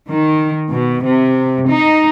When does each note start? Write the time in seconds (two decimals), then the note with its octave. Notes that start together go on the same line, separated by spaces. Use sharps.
0.10 D#3
0.71 B2
1.06 C3
1.70 D#4